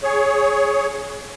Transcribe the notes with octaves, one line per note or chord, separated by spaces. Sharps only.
G#4 C#5